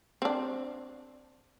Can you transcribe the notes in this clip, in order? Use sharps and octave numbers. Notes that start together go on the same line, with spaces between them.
C4 D4